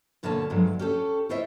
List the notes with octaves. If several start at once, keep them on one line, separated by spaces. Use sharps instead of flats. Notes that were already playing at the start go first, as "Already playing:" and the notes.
G2 B2 D3 A#3 C#5 A5
G2 D3 F3 F#3 G#3 A3
C#4 G4 A4
E4 F4 C5 C#5 D#5 E5